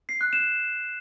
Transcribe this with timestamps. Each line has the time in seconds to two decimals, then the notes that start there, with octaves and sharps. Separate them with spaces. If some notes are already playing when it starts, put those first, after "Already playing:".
0.09 C7
0.21 F#6
0.33 E7